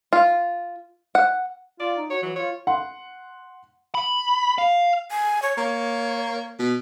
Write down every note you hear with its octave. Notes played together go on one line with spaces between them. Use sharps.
F4
F#5
F4 D5
D#4
F#4 C#5
E3 F#3
F4 C#5
F#5 C6
B5
F5
G#5
C#5
A#3 C#5
B2